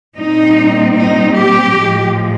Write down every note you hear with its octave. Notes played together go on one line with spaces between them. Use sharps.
A#2 G3 C4 D#4
D#4
G4
A2 F3 G#3